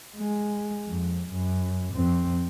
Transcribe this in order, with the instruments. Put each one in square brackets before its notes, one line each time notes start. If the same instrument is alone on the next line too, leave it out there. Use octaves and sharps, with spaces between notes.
[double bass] G#3
F2
F#2
F2 C4